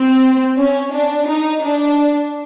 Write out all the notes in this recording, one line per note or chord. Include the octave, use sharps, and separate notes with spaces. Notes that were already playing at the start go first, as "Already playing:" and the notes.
Already playing: C4
C#4
D4
D#4
D4